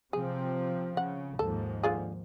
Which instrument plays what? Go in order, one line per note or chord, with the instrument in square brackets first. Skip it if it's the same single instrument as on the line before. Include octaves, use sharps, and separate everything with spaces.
[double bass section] C3 F3 C4 [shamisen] G#4
[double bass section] C#3 [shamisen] F#5
[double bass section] D#2 G#2 F3 [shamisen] A4
[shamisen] D3 F4 G#4